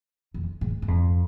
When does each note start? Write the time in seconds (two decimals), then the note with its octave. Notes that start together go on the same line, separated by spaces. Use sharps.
0.34 F2
0.61 G#2
0.82 G#2
0.88 F2